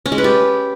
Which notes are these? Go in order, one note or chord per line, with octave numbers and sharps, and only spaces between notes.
C#4
G#3
B4
G4